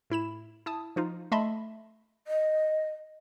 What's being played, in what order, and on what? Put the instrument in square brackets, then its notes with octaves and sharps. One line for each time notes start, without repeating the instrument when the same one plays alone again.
[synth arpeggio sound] A2 E4 B5 E7
E4 A5 D#6
F3 D#4 F4
A3 D#5 E5 A5 B5 C6
[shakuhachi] D#5